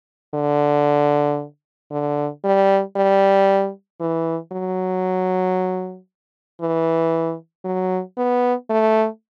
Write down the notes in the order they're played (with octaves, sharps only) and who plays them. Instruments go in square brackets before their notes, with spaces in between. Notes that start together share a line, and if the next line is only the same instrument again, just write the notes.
[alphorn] D3
D3
G3
G3
E3
F#3
E3
F#3
B3
A3